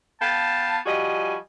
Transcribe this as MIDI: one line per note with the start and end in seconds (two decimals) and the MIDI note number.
0.21 0.79 59
0.21 0.79 77
0.21 0.79 79
0.21 0.79 81
0.86 1.36 53
0.86 1.36 55
0.86 1.36 66
0.86 1.36 75
0.86 1.36 80